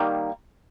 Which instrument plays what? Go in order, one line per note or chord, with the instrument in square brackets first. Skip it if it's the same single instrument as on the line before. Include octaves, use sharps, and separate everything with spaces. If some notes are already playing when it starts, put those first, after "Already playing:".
Already playing: [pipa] D#3 G3 A#3